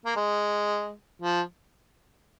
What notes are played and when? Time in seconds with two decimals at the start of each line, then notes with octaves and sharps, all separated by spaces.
0.05 A#3
0.16 G#3
1.22 F3